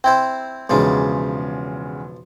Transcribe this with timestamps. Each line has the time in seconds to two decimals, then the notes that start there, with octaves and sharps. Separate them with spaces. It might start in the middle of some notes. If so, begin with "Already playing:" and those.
0.04 C4 E4 C5 G5
0.69 B1 E2 C#3 F3 G#3 D4